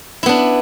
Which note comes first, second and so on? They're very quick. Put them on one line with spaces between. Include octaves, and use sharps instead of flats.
E4 B3 D4